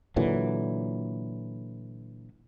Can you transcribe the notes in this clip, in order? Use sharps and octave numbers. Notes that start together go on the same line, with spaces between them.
A#2 D3 E3 F#3